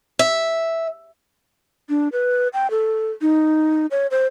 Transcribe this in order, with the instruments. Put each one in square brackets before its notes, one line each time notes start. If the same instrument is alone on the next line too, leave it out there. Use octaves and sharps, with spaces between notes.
[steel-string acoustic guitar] E5
[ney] D4
B4
G5
A4
D#4
C#5
C5